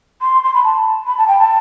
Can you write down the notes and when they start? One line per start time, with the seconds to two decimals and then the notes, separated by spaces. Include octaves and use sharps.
0.21 C6
0.44 C6
0.54 B5
0.64 A5
1.07 B5
1.17 A5
1.28 G5
1.39 A5